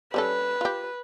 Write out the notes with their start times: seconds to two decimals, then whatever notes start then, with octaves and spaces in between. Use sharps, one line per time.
0.14 G3 C#4 A4 B4
0.61 F4 G4